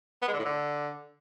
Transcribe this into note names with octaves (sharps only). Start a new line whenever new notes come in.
B3
G#3
D3
A2
D3